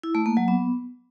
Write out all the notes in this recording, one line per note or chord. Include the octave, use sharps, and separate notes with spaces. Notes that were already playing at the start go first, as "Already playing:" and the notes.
E4
A3
A#3
F#3
B3